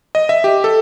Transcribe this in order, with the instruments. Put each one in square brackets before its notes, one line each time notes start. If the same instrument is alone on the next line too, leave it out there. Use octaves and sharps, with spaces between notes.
[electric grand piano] D#5
E5
G4
A4